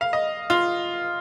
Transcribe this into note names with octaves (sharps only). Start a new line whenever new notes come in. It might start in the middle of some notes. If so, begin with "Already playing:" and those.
F5
D#5
F4